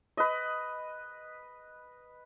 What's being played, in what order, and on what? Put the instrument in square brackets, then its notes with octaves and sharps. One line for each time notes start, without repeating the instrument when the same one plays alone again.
[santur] B4 D#5